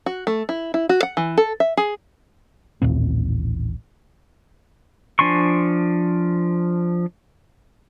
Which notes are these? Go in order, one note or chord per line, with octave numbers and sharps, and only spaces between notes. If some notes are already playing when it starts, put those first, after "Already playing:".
F#4
A3
E4
E4
F#4
F#5
E3
A4
E5
G#4
A1 D#2 A#2 C4
F3 D4 G#5 C6 C#6